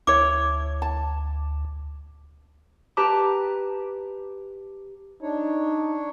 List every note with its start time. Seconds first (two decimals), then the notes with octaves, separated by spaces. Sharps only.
0.07 D2 E4 C#5 D6
0.82 A5
2.97 G4 B4 A5 A#5 D6
5.22 D4 D#4 C#5